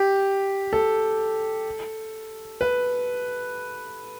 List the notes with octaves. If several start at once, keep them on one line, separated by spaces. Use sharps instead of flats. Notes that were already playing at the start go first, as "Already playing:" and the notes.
Already playing: G4
A4
B4